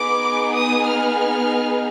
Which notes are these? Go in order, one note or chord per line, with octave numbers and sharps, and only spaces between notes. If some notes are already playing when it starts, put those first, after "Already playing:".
Already playing: B3 D#4 G#4 D6
D#6
F6